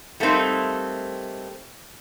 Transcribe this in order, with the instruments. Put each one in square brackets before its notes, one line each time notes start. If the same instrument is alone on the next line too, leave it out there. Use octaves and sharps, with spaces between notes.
[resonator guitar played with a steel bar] G3 A3 A#3 C4 D#4